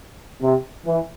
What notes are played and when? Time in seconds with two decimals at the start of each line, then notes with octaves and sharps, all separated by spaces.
0.41 C3
0.85 E3